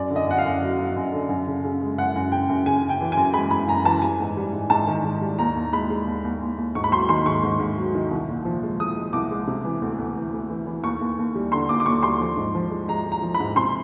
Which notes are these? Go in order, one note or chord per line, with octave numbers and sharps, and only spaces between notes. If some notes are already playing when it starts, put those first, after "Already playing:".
Already playing: F#2 D5
D3
D#5
F#2 F#5
F5
F#2
F#3
F#3
F#2
D3
F#2
C#3
C#3
G#3
F#2 F#5
F#2
C#3 G5
F#2
C#3 G#5
C#3
G5
E3
F#2 G#5
G#3 B5
F#2 B5
F#2 A#5
E3 A5
G3 G#5
G#2
G3
G#2
G#2 A5
D#3
G#2
G3
D#2 A#5
D#2
G#3 B5
G#3
D#2
D#2
D#2
D#2
G#2 C#6
B5
F#3 C6
D#3 C6
G#2 C#6
G#2
G#2
F#3
D#3
C2
A#2
F3
G#3
G#3 D#6
G#3
C2 D6
G#3
C3
E3
D2
D2
E3
D2
E3
E3
D#2 C#6
D#2
D#2
G3
D3 C6
D#2 D6
D6
D#2 C#6
G3 C6
F3
G#2
F3
G#3
G#3 A#5
G#3
A#5
F3
B5
G#2
C3 C6